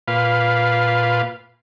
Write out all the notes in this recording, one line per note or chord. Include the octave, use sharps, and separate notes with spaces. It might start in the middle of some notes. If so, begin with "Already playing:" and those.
A#2 F4 B4 F5